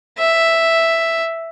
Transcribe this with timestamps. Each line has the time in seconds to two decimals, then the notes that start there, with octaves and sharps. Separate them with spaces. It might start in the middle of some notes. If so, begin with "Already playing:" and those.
0.19 E5